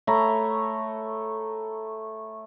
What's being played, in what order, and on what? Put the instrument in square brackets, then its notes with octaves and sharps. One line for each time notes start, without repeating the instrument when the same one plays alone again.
[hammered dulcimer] A3 C#5 A#5 B5